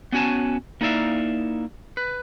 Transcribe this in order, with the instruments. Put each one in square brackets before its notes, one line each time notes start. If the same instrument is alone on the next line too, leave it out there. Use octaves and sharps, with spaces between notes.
[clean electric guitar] B3 C#4 F#4 C#5 G#5 A5
A#3 D#4 E4 D5 E5 F5
B4